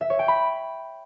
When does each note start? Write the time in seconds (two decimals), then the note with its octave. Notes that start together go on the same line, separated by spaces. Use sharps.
0.01 E5
0.10 C#5
0.19 G5
0.28 B5